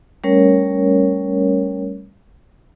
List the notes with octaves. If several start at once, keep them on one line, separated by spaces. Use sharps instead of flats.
G3 A3 C#4 A#4 C#5